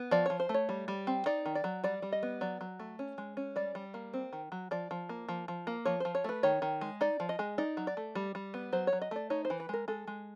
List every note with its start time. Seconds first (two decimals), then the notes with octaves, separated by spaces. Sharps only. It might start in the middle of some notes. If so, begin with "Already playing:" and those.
Already playing: B3
0.11 F3 D5
0.26 F3 C#5
0.40 C5
0.49 A3
0.54 C#5
0.69 G3
0.88 G3
1.07 C4
1.26 D#4 D5
1.46 D#3
1.55 D5
1.64 F#3
1.84 G3 D5
2.02 G3
2.12 D#5
2.23 B3
2.41 F#3 D5
2.61 F#3
2.80 A3
2.99 C#4
3.18 G#3
3.37 C#4
3.56 G3 D5
3.75 G3
3.94 A#3
4.14 C4
4.33 D#3
4.52 F#3
4.71 F3 D5
4.91 F3
5.09 A#3
5.29 F3
5.48 F3
5.67 A#3
5.85 F3 C#5
6.00 F3 C5
6.15 C#5
6.24 A3 B4
6.43 D#3 C#5
6.62 D#3
6.81 G#3
7.01 D#4 D5
7.20 F3
7.29 D#5
7.39 G#3
7.58 D#4 D5
7.77 F#3
7.87 D5
7.97 A3
8.15 G3
8.35 G3
8.54 B3
8.73 F#3 C5
8.87 C#5
8.93 F#3
9.02 D#5
9.11 A3 D5
9.30 D#4 C#5
9.45 C5
9.50 E3
9.60 B4
9.69 G#3 A#4
9.88 G#3 A4
10.07 G#3